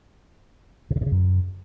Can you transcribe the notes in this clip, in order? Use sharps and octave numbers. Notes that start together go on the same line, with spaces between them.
C3
C#3
A2
C#3
F#2